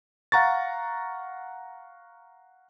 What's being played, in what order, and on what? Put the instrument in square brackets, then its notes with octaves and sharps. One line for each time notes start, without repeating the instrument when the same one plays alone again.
[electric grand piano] F5 F#5 A#5 C#6 A6